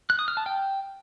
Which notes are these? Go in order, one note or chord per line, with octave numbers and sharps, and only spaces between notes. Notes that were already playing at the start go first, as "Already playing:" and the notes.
F#6
D#6
F6
A5
G5